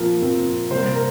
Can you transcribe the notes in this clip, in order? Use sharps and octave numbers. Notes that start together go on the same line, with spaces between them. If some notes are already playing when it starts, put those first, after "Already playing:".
Already playing: A#2 F3 C4 A#4
A#2 F3 C4
C3 G3 A#3 C5
A#4